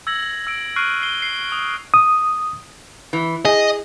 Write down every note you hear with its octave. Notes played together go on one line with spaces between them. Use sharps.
E6 G#6 A#6 F#7
E6 D7
C#6 F6 F#6 C7 D7 D#7
F6 C7 G7
C7
D#6
D#6
E3
G#4 D#5